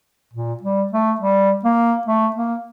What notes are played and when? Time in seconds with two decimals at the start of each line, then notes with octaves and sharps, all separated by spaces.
0.33 A#2
0.63 G3
0.92 A3
1.20 G3
1.65 A#3
2.07 A3
2.36 A#3